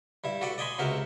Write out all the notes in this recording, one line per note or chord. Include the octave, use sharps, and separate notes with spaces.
G2 E4 E5
F#4 A4 B4 D5
D5 D#5 G#5 B5 C6
C#2 C3 F#4 A#4 C5 E5